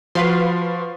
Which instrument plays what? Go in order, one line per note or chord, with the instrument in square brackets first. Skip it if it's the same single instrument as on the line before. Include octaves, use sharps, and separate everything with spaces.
[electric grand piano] F3 F#4 [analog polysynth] B4 F5 C6